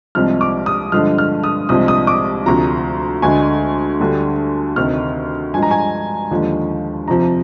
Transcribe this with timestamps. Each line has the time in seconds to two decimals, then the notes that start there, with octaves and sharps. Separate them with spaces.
0.15 C2 C3 F3 G#3 F6
0.41 D6
0.66 D#6
0.92 G2 D3 F3 G#3 F6
1.18 F6
1.44 D#6
1.69 C2 C3 F3 G#3 D#6
1.88 D#6
2.07 D6
2.45 D2 C3 F3 A#5
3.22 D2 D3 G#3 G#5
4.00 D2 D3 G3
4.76 D2 C3 D#3 F6
5.54 G2 F3 G#3 G#5
5.63 A#5
5.71 G#5
6.31 D#2 D3 F3 G#3
7.08 F2 C3 F3 A#5